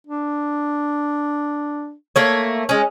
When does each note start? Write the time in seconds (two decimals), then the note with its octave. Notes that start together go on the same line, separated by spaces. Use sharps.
0.07 D4
2.16 A3 A#3 C#5
2.69 G#3 C#4